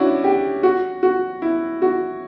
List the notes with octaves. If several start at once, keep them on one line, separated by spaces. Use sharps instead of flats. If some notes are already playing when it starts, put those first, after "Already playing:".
Already playing: C#4 D4 E4 F#4
G4
F#4
F#4
E4
F#4